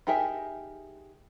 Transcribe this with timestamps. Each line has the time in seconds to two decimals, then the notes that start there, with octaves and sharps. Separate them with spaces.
0.07 D#4 G4 G#4 A#4 E5